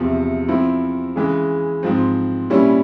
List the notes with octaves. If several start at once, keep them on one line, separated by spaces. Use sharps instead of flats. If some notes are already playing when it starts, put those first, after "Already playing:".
Already playing: E2 C3 F3
F3 C4 E4
C#3 E3 G#3
G#2 F3 C4
A#2 G3 C#4 E4